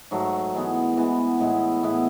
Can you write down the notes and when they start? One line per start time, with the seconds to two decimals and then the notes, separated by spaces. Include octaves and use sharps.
0.11 G#2 F#3 A3
0.54 E3 G#3 B3
0.97 E3 G#3 B3
1.40 A2 G#3 B3 E4
1.83 A2 G#3 B3 E4